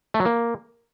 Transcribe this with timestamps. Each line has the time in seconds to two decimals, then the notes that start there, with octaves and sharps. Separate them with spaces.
0.14 A3
0.20 F#3
0.25 A#3